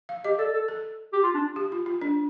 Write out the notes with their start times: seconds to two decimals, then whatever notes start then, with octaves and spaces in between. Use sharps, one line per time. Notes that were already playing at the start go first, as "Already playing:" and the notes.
0.09 F5
0.24 G4 D#5
0.38 A4 D5
0.53 A4
0.68 A4
1.13 G4
1.23 F4
1.35 D4
1.56 G4
1.72 F4
1.86 F4
2.01 D4